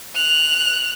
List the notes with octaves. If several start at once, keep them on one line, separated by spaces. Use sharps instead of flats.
F#6 F7